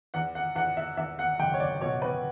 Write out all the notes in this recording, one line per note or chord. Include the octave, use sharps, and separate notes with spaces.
E2 F#5
F#5
E2 F#5
E5
E2 E5
F#5
F#1 G5
C#5
D5
B2 C#5
B4